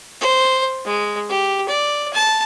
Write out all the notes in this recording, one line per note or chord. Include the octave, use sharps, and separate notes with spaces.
C5
G#3
G4
D5
A5